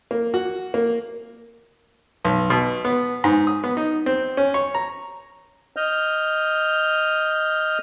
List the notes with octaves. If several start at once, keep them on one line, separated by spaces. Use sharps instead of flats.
A#3
F#4
A#3
B1
B2
B3
G#2
D#6
B3
D#4
C4
C#4
C#5
A#5
D#5 F6 G6